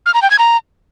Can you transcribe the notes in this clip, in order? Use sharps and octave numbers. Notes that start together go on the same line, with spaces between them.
F6
A#5
G5
G#6
A#5